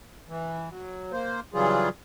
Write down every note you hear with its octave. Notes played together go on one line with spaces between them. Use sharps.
E3
F#3
A#3 C5
C#3 E3 F#3 G3 F4 G#4